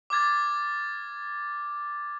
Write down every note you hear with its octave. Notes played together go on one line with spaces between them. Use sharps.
D6 F6 G#6 A6